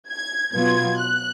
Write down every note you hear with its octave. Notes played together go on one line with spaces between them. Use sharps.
G#6
B2 F#3 B3 F4 G#6
F#6